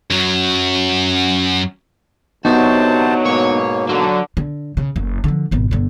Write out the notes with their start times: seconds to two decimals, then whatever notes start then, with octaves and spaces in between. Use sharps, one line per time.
0.11 F#2 F#3
2.45 D2 C3 F#3 B3 D#4 F#4 C5 A5
3.25 G#2 B2 A#3 C#5
3.89 D3 F#3
4.37 D3
4.77 C#3
4.96 F#1
5.24 D3 F3
5.51 G#1 B2
5.71 G1 D3